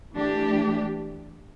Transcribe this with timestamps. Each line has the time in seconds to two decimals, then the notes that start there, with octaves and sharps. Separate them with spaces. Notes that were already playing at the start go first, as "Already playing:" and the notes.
0.14 E3 A3 D4 G4